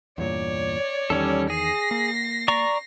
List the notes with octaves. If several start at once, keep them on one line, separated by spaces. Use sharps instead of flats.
E2 G2 A#2 C#5 D5
E2 D#3 G3 C#4 A4
G#4 A#6 C7
A#3
D5 A#5 C#6